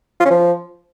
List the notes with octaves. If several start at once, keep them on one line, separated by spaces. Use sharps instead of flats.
F4
C#4
F3